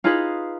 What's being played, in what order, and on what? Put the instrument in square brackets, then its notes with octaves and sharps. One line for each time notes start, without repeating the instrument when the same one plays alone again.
[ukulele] D#4 F4 G#4 B4 F5